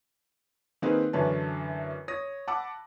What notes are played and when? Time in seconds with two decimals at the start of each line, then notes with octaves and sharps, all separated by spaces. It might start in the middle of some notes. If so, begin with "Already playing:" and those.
0.82 D#3 A#3 C4 D#4 G#4 B4
1.13 F#2 D3 E3 C#4 B4 A5
2.08 C#5 D#6 A#6
2.48 F#5 A5 B5 D6 E6